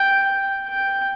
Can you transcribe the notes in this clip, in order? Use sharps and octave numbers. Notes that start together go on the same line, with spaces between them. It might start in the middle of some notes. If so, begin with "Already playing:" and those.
Already playing: G5
G5